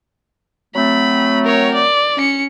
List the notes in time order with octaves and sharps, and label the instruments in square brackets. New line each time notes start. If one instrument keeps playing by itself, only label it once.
[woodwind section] F#3 A3 C4 [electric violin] B5
[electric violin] A#4 C#5
D5
C#4 C#7